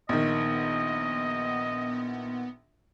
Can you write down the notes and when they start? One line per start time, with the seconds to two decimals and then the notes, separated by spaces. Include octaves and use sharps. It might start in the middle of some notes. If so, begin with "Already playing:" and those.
0.09 A#1 D#3 B3 D#5